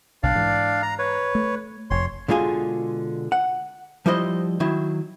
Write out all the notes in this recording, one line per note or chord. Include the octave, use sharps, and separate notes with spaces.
B1 D4 D5 F5
G#2 E3
A#5
B4 C#5
A3
F1 F2 C#5 C6
B2 D3 G#3 F4 G#4 G#5
F#5
F3 G3 E4 C5 D5 D#5
D#3 F#3 E4